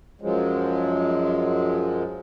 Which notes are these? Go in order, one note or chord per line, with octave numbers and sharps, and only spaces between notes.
F#2 F3 F#3 G#3